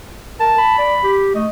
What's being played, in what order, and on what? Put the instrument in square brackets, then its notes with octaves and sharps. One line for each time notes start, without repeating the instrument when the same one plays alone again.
[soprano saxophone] A#4 [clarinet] A5
[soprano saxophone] B5
[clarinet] D5
G4
[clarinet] A3 [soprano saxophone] D#5